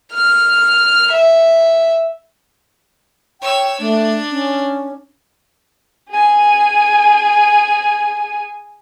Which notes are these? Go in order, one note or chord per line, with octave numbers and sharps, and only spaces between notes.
F6
E5
C#5 G5 E6
A3 D4
C#4
G#4 G#5